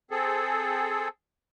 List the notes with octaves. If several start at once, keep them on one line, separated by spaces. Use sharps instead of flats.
C4 G#4 A4